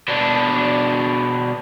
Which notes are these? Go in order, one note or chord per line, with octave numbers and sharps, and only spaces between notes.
B2 D4